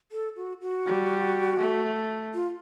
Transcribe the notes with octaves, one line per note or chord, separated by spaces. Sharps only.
A4
F#4
F#4
G3
A3
F4